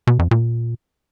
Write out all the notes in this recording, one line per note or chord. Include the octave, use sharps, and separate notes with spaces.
B2
F2
A#2